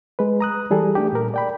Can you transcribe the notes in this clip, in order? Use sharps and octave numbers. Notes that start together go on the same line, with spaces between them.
G#3 B4
A#5 D#6 F#6
E3 G3 G#4 A4
A3 D4 G4
A#2 A#4
D5 G5 B5